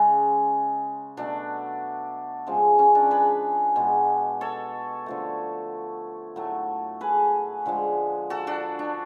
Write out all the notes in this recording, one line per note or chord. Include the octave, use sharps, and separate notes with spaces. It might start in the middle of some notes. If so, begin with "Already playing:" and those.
Already playing: C#3 G#3
B2 F#3 A3 D4
C#3 F3 G#3
C#4
D4
G#4 B4
B2 G#3
A4 C#5
D3 F3 A3
A2 F#3 A3
G#4 B4
D3 F3 G#3
F#4 A4
D4 F#4
D4